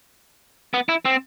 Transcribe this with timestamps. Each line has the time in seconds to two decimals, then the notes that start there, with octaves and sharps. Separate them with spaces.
0.74 B3
0.89 E4
1.05 C4